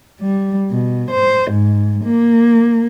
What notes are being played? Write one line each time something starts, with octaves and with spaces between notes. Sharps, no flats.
G3
B2
C5
G#2
A#3